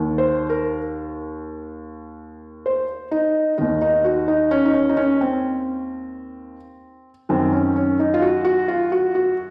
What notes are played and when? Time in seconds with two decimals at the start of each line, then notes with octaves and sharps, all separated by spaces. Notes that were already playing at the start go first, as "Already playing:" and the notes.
Already playing: D#2 D#3
0.18 C5
0.50 A#4
2.66 C5
3.11 D#4
3.58 D#2 D#3 D#4
3.82 D#4
4.04 F#4
4.28 D#4
4.51 C#4
4.65 D#4
4.74 C#4
4.89 D#4
4.97 C#4
5.21 C4
7.29 F#2 D#3 C4
7.53 C#4
7.76 C#4
7.99 D#4
8.14 F4
8.22 F#4
8.45 F#4
8.68 F4
8.92 F#4
9.15 F#4